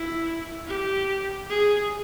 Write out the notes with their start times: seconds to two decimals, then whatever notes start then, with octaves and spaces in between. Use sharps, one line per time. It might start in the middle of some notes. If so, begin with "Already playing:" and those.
Already playing: E4
0.68 G4
1.50 G#4